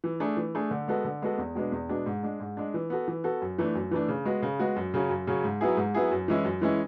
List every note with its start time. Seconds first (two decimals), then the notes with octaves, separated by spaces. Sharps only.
0.04 E3
0.20 A3 D4 G#4
0.37 E3
0.55 A3 D4 G#4
0.71 D3
0.88 G#3 B3 F#4 A4
1.05 D3
1.22 G#3 B3 F#4 A4
1.38 E2
1.55 B2 G#3 B3 D4
1.72 E2
1.89 B2 G#3 B3 D4
2.06 G#2
2.23 G#3 D4
2.40 G#2
2.57 G#3 D4
2.74 E3
2.90 B3 F#4 A4
3.08 E3
3.24 B3 F#4 A4
3.42 F#2
3.58 E3 A3 D4
3.75 F#2
3.91 E3 A3 D4
4.08 C#3
4.25 G#3 B3 F#4
4.43 C#3
4.59 G#3 B3 F#4
4.76 F#2
4.94 C#3 F#3 C#4
5.10 F#2
5.27 C#3 F#3 C#4
5.44 G#2
5.61 F#3 B3 E4 G#4
5.77 G#2
5.94 F#3 B3 E4 G#4
6.11 F#2
6.28 E3 G#3 C#4 E4
6.45 F#2
6.62 E3 G#3 C#4 E4